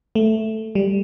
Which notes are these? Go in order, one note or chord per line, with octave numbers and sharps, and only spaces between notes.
A3
G3